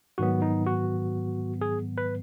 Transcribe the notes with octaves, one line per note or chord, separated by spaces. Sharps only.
G#2 D#3 F#3 B3 F#4
D#4
F#4
G#4
B4